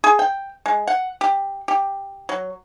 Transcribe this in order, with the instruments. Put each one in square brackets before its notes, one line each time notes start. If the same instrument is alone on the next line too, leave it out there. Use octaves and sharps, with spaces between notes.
[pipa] G#4
G5
G#3
F#5
G4
G4
F#3